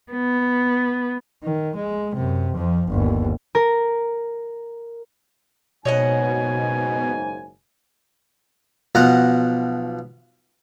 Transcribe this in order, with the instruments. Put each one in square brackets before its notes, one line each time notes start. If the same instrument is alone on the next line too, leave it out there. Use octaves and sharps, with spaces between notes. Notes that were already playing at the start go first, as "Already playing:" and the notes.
[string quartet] B3
[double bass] D#3
G#3
F#2 C3
F2 F3
G1 D#2
[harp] A#4
[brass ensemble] F#1 G#2 G#5 [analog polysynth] B2 [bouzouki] C#5 D#5 F#5
[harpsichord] B1 F3 F#5 A#5